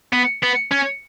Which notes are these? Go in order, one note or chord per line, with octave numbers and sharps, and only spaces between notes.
B3
B3
C#4